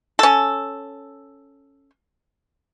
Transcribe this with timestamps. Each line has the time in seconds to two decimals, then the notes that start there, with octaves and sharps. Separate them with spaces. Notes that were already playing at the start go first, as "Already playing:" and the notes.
0.19 C#4 A4